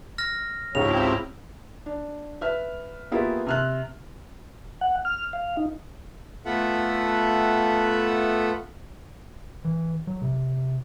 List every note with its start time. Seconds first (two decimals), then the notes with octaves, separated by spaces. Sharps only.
0.18 F6 A#6
0.75 C#2 G#2 F3 C4 E4 G4 C#5 F7
1.86 D4
2.41 B4 E5 F6
3.12 A#3 B3 E4 F4 G4 G#4
3.47 C3 F6 F#6
4.81 F#5
5.05 F6
5.33 F5
5.57 D#4
6.45 A3 B3 F4 A4 E5 F#5
9.65 E3
10.07 F#3
10.22 C3